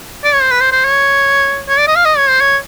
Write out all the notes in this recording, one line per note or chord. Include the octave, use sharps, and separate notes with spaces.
D5
C#5
C5
B4
C5
C5
C#5
C#5
D5
D#5
F5
D#5
C#5
C5
C#5